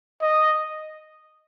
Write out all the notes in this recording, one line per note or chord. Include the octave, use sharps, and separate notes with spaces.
D#5